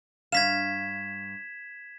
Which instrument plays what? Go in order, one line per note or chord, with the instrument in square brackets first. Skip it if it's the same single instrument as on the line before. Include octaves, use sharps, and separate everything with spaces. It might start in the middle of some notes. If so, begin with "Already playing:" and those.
[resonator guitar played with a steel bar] G2 F5 [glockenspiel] G#6 B6 E7